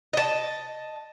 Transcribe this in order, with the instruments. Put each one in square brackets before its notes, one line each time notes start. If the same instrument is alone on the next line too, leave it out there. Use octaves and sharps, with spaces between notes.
[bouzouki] D#5 A5